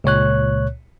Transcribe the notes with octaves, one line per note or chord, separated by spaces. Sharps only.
C#2 A#2 C#5 F#6